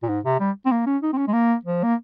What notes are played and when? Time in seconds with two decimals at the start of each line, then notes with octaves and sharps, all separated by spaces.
0.03 A#2
0.09 G#2
0.25 C3
0.40 G3
0.66 C4
0.72 A#3
0.87 C#4
1.03 D#4
1.13 C4
1.18 C#4
1.28 G#3
1.33 A#3
1.65 F3
1.83 A#3